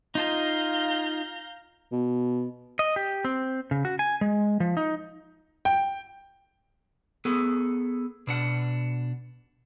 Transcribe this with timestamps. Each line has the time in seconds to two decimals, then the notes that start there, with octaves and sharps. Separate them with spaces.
0.15 D#4 F4 D#5 F5 A#5 G6
1.92 B2
2.79 D#5
2.96 G4
3.25 C4
3.71 C#3
3.85 F#4
3.99 G#5
4.21 G#3
4.60 F3
4.77 D#4
5.65 G5
7.25 B3 G#4 A4
8.27 B2 D4 F#5